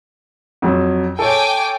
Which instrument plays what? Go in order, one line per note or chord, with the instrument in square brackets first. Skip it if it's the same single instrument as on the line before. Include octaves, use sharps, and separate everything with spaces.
[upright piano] F2 F#3
[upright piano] A4 C#5 [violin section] G5 G#5 D6